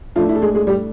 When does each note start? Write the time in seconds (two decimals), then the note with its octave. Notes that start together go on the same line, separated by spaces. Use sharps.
0.16 A2 F3 A3 D4 F4
0.29 E4
0.35 A4
0.42 G#3 G#4
0.54 G#3 G#4
0.67 G3 G4